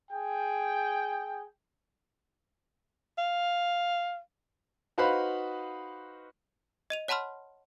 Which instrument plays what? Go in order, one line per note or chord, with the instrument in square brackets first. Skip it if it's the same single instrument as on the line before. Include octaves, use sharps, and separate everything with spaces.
[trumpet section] G#4 G5
[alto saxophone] F5
[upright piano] D#4 F#4 B4 C5 F5 B5
[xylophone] D#5 D#7 F7
C#5 F#5 A5 B5 C6 F6